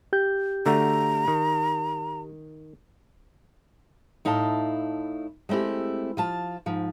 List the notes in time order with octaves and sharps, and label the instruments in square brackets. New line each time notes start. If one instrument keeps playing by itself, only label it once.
[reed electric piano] G4 G6
[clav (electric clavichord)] D3 A3 F#4 [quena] A#5
[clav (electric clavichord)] D#3
[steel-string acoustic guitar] A2 D#4 E4 F5 A5
G#3 A3 C4 E4 G4
F3 F4 A5
G#2 F3